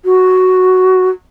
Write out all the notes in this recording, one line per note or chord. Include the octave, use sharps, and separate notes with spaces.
F#4